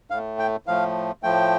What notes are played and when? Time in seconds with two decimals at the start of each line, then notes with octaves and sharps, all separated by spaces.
0.10 A2 A3 F5
0.39 G5
0.67 A2 F3 A3 F5
1.23 A2 F3 A3 G5